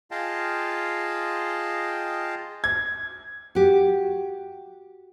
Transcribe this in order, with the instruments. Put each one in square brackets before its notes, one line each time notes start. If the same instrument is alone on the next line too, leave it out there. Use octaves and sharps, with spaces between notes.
[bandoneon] F4 G#4 D#5 F5 G5 A5
[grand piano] G#6
[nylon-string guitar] F#4 G4